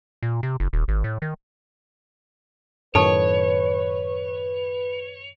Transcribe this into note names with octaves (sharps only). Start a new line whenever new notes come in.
A#2
C3
F#1
D#1
G#1
A2
D#3
F#2 A2 D#3 A4 B4 C#5 A5 C#6